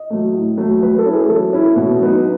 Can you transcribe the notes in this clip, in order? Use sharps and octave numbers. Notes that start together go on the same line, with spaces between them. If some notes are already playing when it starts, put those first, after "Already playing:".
Already playing: D#5
F#3 A3
A2
F#3 A3
F#3 B4
A4
C#4 E4
G#4
F#3 A4
C#4 E4
B2
F#3 B3 D#4